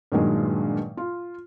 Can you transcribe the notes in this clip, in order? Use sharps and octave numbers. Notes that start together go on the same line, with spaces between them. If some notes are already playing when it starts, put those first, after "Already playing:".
G2 A#2 D#3 F#3 G#3
F4